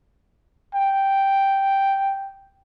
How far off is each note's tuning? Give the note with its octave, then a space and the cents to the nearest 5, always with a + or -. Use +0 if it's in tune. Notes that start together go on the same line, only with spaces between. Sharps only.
G5 -5